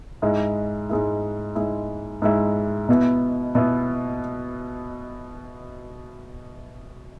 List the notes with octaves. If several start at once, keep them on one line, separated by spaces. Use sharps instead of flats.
G#2 G#3 E4
G#2 G#3 E4
G#2 G#3 E4
G#2 G#3 E4
B2 B3 E4
B2 B3 E4